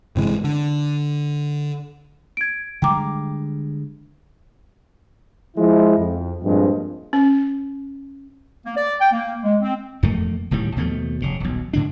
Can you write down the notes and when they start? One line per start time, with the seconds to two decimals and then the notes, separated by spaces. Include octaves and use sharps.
0.16 G1 C3 E3 G#3
0.44 D3
2.37 G#6 D7
2.82 D3 G3 G#3 G5 A#5 D6
5.57 F3 G#3 E4
5.98 F2
6.43 G2 A#2 F3 G#3 C4
7.13 C#4
8.65 A#3
8.76 D5
9.00 G5
9.12 A#3
9.43 G#3
9.61 C4
10.03 E1 F2 A3 A#3
10.51 D1 A2 D#3 G3
10.76 D#2 B2 F3 A3
11.22 F1 C#3
11.40 D#1 B1
11.73 G#2 D3 D4